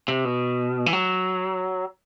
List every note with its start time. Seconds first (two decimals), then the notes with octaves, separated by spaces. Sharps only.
0.08 C3
0.25 B2
0.86 E3
0.93 F#3